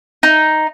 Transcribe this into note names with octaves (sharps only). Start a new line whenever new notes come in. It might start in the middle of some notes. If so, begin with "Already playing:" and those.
D#4